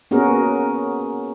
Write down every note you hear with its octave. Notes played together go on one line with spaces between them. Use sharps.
A#3 B3 C#4 F#4 G#4 A#4